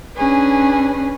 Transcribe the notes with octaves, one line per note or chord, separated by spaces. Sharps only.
C#4 D4 G#4 B4